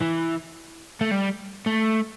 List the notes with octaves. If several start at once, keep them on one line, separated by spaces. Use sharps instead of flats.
E3
A3
G3
A3